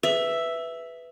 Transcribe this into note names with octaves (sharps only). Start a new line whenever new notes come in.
G#4 B4 E5